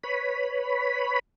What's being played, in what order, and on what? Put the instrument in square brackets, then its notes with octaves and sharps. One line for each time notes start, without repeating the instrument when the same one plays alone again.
[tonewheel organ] B4 C#5 B5